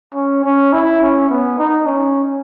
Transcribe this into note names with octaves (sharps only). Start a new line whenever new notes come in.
C#4
C#4
E4
C#4
B3
D#4
C#4